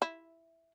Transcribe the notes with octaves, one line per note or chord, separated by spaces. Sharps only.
E4